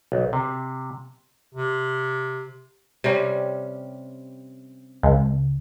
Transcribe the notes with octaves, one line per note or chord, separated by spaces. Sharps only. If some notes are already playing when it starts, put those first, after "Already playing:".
B1
C3
C3
C3 G3 C#4
C#2